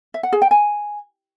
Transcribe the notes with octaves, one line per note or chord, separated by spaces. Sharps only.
E5
F#5
G#4
G5
G#5